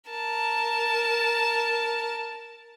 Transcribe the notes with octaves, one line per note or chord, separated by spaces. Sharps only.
A#4 A5